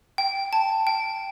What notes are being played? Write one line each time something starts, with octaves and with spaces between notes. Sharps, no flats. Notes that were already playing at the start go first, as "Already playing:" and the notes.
G5
A5
G5